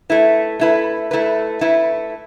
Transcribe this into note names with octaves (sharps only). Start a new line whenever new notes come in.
A3 E4 B4
A3 E4 B4
A3 E4 B4
A3 E4 B4